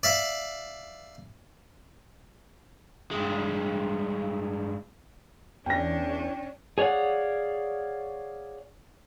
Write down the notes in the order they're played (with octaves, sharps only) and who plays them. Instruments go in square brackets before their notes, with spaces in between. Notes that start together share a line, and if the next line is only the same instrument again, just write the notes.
[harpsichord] D5 E5 F5
[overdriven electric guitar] G2 G#3
[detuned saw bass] E2 [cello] C#4 D4 [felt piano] G5 A#6
[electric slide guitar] G#4 C#5 D5 F5 F#5